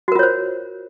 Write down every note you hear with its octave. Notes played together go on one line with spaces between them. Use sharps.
F4 F#4 A#4 C5 C#5